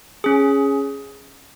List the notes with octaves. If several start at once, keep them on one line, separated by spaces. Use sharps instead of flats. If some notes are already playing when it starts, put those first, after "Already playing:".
C#4 G#4